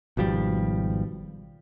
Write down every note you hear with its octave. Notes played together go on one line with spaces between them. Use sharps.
G#1 B2 F3 G3